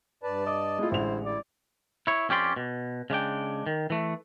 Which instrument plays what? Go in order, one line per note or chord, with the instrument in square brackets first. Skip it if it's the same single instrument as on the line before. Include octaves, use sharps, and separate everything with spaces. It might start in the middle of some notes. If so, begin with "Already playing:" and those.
[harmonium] G2 D5 A5 [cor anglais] B4
[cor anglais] D#5 [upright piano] D6
[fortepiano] G#3 A3 F4 [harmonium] E4
[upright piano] A1 G#3 F7 [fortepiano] D3 [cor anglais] C5
[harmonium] E4 [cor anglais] D5
[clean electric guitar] E4 C#5
F2 C#4 G4 D5 C6
B2
C#3 G#3 D4 G5
D#3
E3 A3